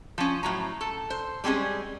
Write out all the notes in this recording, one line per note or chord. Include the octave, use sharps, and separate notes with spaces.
F3 C#4
A2 F#3 A#5
A4
C5
G3 G#3 C4 C#4 G#4